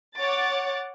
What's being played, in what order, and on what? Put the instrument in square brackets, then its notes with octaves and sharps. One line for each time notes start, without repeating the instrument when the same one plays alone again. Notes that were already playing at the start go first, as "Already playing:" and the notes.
[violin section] C#5 F#5 D6 A6